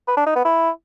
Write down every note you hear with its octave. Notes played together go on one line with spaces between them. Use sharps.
B4
D4
D#4
B3
E4